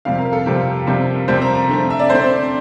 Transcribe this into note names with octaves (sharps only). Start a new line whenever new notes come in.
F2 C3 G3 C4 F5
A#4
A4
F2 C3 G3 C4
F2 C3 G3 C4
F2 C3 G3 C4 C5
A#5
A#5
D3 A3 C4
E5
D5
D3 A3 C4 C5